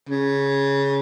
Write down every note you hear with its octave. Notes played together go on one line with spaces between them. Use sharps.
C#3